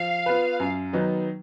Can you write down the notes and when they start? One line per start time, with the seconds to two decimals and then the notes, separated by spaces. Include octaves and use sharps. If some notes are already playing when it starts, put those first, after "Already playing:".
Already playing: F3 F5
0.26 B3 F4 B4
0.60 F#2
0.93 D#3 F#3 B3 D#4